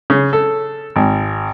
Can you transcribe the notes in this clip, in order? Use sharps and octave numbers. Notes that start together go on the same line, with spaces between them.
C#3
A4
G#1